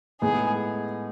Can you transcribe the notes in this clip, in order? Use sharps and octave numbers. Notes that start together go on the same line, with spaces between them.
A2 G#3 B3 D#4 G#4